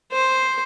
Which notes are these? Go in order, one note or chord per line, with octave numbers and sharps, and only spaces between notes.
C5